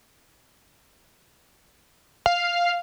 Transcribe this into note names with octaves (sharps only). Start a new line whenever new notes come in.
F5